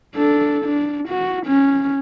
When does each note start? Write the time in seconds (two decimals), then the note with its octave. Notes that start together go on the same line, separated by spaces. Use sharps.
0.15 D4 A4
0.65 D4
1.08 F#4
1.46 C#4